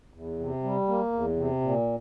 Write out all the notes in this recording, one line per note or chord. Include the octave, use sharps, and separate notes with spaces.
E2
C3
G3
A#3
E2
C3
A#2